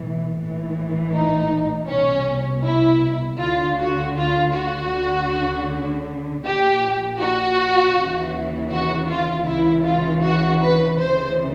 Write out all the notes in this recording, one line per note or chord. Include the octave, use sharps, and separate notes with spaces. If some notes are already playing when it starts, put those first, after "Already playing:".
Already playing: B1 A2 E3
A#1 A2 E3
D#4
C2 B2 C#4
E4
D2 D3 F4
F#4
F4
F#4
D2 D3
A#1 A#2 G4
F#4
D#2 C#3 E3
F#4
F4
C#2 C#3 E3 E4
F4
F#4
B4
D2 C#3 E3 C5